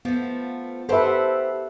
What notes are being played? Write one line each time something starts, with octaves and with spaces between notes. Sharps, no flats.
F3 A3 B3
G4 A4 B4 C5 E5 F#5